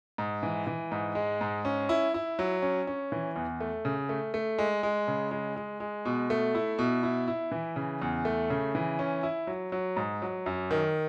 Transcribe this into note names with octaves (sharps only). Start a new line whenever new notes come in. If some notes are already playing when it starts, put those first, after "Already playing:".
G#2
E3
E3
G#2
G#3
G#2
C#4
E4
E4
F#3
C#4
C#4
E3
E2
A3
C#3
A3
A3
G#3
G#3
C#3
G#3
G#3
G#3
B2
A3
E4
B2
E4
E4
E3
C#3
E2
A3
C#3
E3
C#4
E4
F#3
F#3
G#2
F#3
F#2
D#3